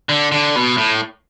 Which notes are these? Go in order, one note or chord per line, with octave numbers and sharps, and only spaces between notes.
D3
D3
B2
A2